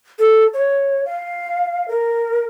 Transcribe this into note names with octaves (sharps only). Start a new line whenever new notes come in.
A4
C#5
F5
A#4